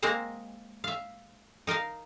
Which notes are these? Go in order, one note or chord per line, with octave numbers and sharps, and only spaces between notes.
G#3 A#3 C4 C5 A#5
E5 F5
D#4 A#4 D#5 F5